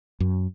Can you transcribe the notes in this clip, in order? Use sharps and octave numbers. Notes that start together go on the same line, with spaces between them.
F#2